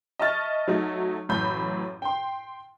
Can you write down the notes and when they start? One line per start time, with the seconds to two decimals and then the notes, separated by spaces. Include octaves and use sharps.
0.19 D#5 E5 A5 C#6 F6 A6
0.67 F#3 A3 D#4
1.29 A1 F#2 A2 B5 G6
2.02 G5 C6